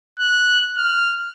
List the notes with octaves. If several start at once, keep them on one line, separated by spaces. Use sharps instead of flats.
F#6
F6